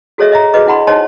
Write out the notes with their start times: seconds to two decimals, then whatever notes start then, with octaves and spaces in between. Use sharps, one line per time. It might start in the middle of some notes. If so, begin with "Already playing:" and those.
0.18 F#4 G#4 A4 C#5 D#5 E5
0.32 D#5 E5 A#5
0.54 F#4 G#4 B4 D#5 D6
0.66 D4 E4 F#5 B5 C6
0.87 D#4 C5 C#5 D#5 A5 C6